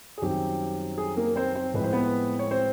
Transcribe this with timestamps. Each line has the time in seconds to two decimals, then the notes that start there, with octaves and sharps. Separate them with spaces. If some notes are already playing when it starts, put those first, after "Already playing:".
0.18 G#4
0.22 F#2 D#3 G3 C4 G4
0.98 G#4
1.17 A#3 A#4
1.36 C4 C5
1.55 C4 C5
1.74 A2 F3 G#3 C4 B4
1.84 C5
1.93 B3 B4
2.39 C#5
2.51 C4 C5